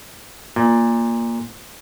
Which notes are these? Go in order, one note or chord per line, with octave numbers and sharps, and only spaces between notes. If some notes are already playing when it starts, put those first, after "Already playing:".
A#2